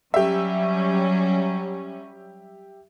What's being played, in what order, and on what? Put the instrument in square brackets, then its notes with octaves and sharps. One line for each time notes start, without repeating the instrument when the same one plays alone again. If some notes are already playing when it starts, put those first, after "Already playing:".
[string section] F#3 G3 C#4 [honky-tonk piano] G4 E5